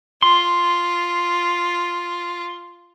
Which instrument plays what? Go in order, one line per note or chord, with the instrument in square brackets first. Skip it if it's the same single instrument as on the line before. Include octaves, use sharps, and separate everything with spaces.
[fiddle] F4 [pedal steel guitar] C6